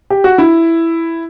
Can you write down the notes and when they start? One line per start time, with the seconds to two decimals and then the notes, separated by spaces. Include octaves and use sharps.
0.10 G4
0.24 F#4
0.38 E4